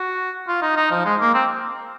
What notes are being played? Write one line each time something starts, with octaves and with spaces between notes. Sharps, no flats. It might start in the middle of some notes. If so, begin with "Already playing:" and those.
Already playing: F#4
F4
D#4
D#4
F3
G#3
A#3
C4